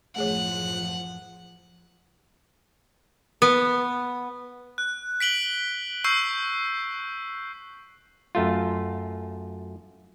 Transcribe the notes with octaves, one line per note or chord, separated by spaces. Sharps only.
A1 F#2 F3 A3 G#4 C#5 F#5
B3
F#6
B6 D7 F#7 G7
C#6 E6 G6 C7
F#2 A3 F4